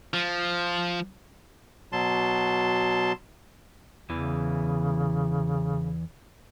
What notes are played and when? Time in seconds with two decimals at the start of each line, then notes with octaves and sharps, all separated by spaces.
0.14 F3
1.92 B2 F#3 A5 C6
4.10 E2 C#3 E3